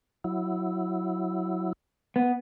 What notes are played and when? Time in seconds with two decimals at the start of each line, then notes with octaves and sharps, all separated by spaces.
0.24 F#3 E4
2.16 B3